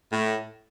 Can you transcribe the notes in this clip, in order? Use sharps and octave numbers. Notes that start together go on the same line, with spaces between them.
A2